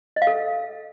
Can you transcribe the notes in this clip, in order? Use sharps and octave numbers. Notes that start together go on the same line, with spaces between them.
D#5
F5
A4